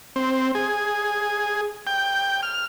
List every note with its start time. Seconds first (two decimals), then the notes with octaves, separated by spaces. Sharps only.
0.16 C4
0.55 G#4
1.87 G5
2.43 F6